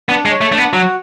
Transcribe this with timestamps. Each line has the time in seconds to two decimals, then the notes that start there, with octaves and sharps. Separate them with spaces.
0.09 B3 D4
0.26 G#3
0.31 C#5
0.41 A3
0.52 A3 D4
0.58 B3
0.73 F#3 F#4